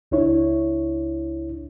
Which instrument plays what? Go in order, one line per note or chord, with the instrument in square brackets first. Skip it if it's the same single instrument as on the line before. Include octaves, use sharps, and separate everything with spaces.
[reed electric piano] C#2 D4 E4 C#5